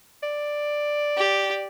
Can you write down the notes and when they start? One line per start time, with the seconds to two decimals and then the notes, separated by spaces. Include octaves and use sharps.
0.23 D5
1.16 G4